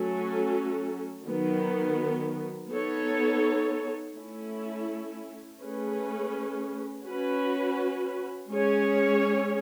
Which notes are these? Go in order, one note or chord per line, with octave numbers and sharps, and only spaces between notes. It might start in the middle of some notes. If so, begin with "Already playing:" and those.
Already playing: F#3 A3 C#4 F#4 A4
D#3 F#3 B3
B3 D#4 A4 C#5
A3 C#4 E4
A3 C#4 G#4 B4
C#4 F#4 B4
G#3 C#4 G#4 C#5